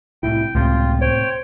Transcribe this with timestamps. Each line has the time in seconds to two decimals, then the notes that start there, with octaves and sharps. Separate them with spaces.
0.23 C2 A2 E4 G5
0.55 C#2 A2 C3 F4 G5
1.01 C5 C#5 G5